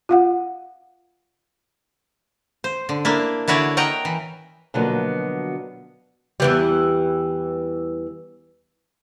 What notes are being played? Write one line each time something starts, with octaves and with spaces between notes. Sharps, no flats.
F4 F5 F#5
C5
D3
A#3 D4 E4
D3 E4 F#4 C#5 D5
A#4 D#5 F#5 G5 A#5
E3
B2 D3 F3 F#3 A#3 B3
E2 E3 G3